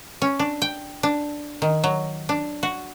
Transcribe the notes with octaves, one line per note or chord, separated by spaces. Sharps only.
C#4
D4
G5
D4
D#3
F#3
D4
F#4